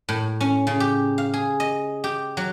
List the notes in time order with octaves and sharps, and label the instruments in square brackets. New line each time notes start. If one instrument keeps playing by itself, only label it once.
[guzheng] A2
C#4
C#3
G4
F5
G#4
D#5
G4
F#3